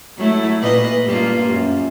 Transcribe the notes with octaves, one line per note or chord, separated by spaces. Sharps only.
F#3 A3 E4
A#2 B4 D#5
G2 A#3 F4
F#2